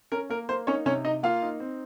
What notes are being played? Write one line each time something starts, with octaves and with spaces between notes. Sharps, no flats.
C#4 A#4
A#3 A#4
A#3 C5
C#4 D#4 C#5
C3 C#4 C#5
D#4 D#5
A#3 F4 F5
D#4
C4